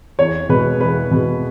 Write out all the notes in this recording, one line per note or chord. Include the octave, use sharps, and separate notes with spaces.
E2 C#5
B2 G#3 B4
E2 B4
B2 G#3